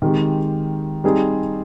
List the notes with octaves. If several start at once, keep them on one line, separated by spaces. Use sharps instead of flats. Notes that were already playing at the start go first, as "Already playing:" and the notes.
D#3 G#3 C4 G4
G3 C4 D#4 G#4